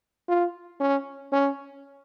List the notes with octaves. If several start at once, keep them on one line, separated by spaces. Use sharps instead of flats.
F4
C#4
C#4